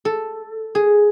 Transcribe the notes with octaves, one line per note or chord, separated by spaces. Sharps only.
A4
G#4